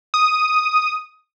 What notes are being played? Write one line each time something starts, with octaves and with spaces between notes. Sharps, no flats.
D#6